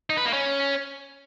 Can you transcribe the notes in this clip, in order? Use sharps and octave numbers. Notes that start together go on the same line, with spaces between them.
D#4
B4
A#3
C#4